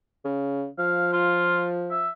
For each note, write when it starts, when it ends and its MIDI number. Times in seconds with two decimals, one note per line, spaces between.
0.25 0.67 49
0.78 2.07 53
0.78 1.09 77
1.13 1.71 65
1.90 2.09 76